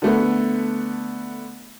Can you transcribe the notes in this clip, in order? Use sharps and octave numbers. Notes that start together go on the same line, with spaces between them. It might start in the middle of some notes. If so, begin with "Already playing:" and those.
D3 A3 B3